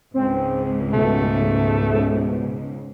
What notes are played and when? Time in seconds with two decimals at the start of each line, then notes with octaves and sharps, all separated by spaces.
0.14 C#2 G#2 C4
0.93 B2 A3